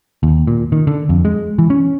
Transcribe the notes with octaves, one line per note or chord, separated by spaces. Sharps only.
D#2
A#2
D#3
D3
F2
G#3
E3
C#4